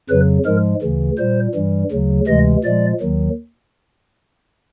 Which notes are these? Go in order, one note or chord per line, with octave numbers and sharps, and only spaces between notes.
F2 C#3 F#3 B4
G#2 F3 G#3 A#4
D2 C#3 E3
A#2 G3 C5
G2 E3 G3
D2 C#3 F#3
D2 C3 E3 G#3 D#5
A#2 F3 G#3 D5
D#2 D#3 F#3